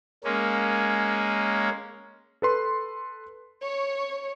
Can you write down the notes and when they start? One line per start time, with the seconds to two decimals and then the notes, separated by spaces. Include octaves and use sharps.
0.24 G#3 A#3 C#4
2.42 A4 B4 C6
3.63 C#5